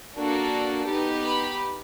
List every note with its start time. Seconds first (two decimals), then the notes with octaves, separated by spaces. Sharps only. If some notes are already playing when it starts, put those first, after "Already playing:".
0.18 A#3 D4 F#4 A4
0.87 B3 D#4 G4
1.23 B5